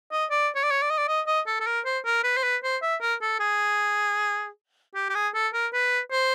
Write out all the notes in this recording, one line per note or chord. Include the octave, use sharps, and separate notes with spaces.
D#5
D5
C#5
D5
C#5
D5
D#5
D5
D#5
D#5
A4
A4
A#4
C5
A#4
B4
C5
B4
C5
E5
A#4
A4
G#4
G4
G4
G#4
A4
A#4
B4
C5